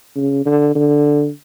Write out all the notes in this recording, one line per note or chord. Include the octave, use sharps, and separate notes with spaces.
C#3
D3
D3